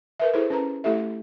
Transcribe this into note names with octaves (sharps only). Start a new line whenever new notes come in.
A#4 B4 E5
E4 G#4 A4 C5
C#4 B4 A#5
A3 E4 G4 A4 E5